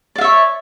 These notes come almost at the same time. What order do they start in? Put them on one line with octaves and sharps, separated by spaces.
D5 F5 E5 C#5